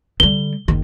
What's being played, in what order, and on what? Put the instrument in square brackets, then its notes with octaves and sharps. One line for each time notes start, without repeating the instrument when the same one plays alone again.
[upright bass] D3 G3 [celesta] G7
[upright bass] F#1 D#3